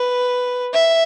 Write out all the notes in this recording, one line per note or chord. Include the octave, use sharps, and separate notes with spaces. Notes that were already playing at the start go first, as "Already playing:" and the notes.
Already playing: B4
E5